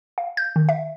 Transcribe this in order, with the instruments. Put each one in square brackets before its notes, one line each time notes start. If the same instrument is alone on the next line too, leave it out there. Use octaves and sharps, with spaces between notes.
[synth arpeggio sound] F5
G6
D#3
E5